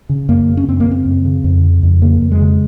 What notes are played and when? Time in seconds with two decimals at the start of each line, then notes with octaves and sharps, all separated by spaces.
0.09 C#3
0.29 F#2 A#3
0.48 C#3
0.57 C#4
0.68 F#2 C4
0.80 A#3
0.86 C#3
0.91 C4
1.06 F#2
1.25 C#3
1.44 F2
1.63 C#3
1.83 F2
2.02 C#3 A#3
2.22 F2
2.32 G#3
2.41 C#3